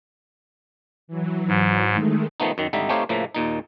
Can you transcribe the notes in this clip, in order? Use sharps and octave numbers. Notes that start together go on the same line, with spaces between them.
E3 F#3
G#2
D#3 G#3 A3
D#3 F3 A3 B3 D#4
F#2 D#3
G#1 D3 G3 D#4 E5
A3 C4 D#4 G4 C#5 F5
A2 C#3 F3 A#3 E5
D#2 A#2 D#4